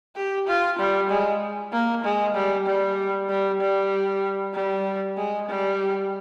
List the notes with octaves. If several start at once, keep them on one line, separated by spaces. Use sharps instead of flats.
G4
F4
G3
G#3
A#3
G#3
G3
G3
G3
G3
G3
G#3
G3